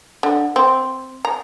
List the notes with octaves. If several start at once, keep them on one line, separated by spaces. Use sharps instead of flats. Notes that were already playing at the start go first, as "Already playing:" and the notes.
D3
C4
A#5